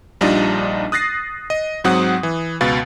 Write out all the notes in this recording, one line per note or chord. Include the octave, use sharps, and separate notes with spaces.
A#1 G3 D4 D#4 F4 D#5
D#6 F#6 A6 A#6 C7
D#5
G#2 F#3 C4 F#5 D#6 F#6
E3
C#2 B2 B4 F5 A6